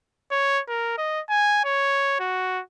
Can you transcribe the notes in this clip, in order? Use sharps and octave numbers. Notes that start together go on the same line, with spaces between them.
C#5
A#4
D#5
G#5
C#5
F#4